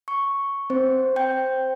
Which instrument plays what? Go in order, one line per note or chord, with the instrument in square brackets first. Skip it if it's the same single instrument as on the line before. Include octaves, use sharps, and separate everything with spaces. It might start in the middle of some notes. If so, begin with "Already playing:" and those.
[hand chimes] C#6
C4 C5
C5 G5 G6